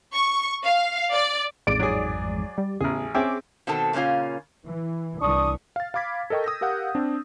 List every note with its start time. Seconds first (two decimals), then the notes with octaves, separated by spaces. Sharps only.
0.13 C#6
0.65 F5
1.13 D5
1.67 A1 F2 G#2 D5 D7
1.79 F#3 G#4
2.58 G3
2.80 A1 E2 C#3 G#4
3.15 C4 C#4 G#4 E5 G5 D6
3.67 B2 D#3 C4 A4 A5
3.93 A#2 C#3 A#3 C#4 F4
4.65 E3
5.21 C2 E3 D4 C#6 D#6
5.76 F5 A6
5.94 F5 B5 D6 G#6 B6
6.30 A4 A#4 D#5 G5 C#6
6.44 D#6 E6 G6 A#6
6.61 G4 A#4 F5 F#5 G6
6.95 C4 D4